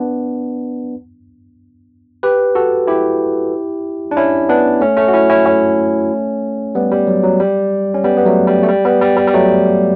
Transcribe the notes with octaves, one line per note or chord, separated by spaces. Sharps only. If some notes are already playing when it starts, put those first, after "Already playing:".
Already playing: B3 D4
G4 B4
F#4 A4
E4 G4
D4
C#4 E4
B3 D4
A3 C#4
A3 C#4
F#4
C#4 E4
C#4 E4
A3 C#4
G3 B3
G3
F#3
F#3
G3
C#4
G3 B3
B3
F#3 A3
G3
A3
G3
G3 B3
G3
G3
G3
F#3 A3